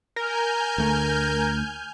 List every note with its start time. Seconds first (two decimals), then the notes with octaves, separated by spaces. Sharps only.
0.16 A#4 G#5 F6 G6
0.78 D2 A3